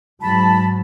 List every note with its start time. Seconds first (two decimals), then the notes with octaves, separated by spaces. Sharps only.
0.21 G#2 F#3 A5 B5